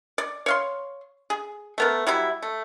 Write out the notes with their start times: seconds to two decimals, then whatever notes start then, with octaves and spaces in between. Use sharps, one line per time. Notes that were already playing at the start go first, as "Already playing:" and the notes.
0.18 D5
0.46 C#5 F5 C6
1.30 G#4
1.78 A3 B3 A#4
2.07 F#3 G3 E4
2.42 A3